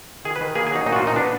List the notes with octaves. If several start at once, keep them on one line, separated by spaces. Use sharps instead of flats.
D#3 G#4
B4
D#3
A#3 G#4
G#4
F#3 D#4
A#2 D#4
F#4
F4
A#2
D#4
B3 D4